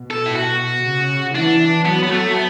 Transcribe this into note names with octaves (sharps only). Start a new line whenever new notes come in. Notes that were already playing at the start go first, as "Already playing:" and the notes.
Already playing: B2
A4
E4
F#4
C#3
E3 D4
F#3 B3
B3
A3
B3